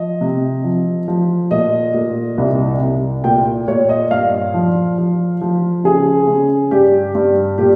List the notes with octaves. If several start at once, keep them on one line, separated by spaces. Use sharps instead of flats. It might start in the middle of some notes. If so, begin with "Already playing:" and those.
Already playing: F3 D#5
C3
F3
F3
A#2 D#5
A#2
C2
C2
A#2 G5
A#2 C#5
D#5
G2 F5
F3
F3
F3
C#3 G#4
C#3
G2 G4
G2
A#2 G4